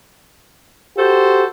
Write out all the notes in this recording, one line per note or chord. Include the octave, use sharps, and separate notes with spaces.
F#4 G4 A4 C5